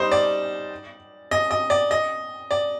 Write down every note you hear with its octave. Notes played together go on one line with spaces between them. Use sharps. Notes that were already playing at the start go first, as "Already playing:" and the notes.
Already playing: G3 D#4 C5
D5
D#5
D#5
D5
D#5
D5